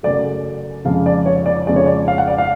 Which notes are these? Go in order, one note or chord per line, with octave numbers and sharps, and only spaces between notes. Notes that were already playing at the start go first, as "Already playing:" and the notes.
F#2 C#3 F#3 A3 D5
F2 C#3 F3 G#3 F5
D5
C#5
D5
F2 C#3 G#3 D5
C#5
D5
F5
F#5
D5
F5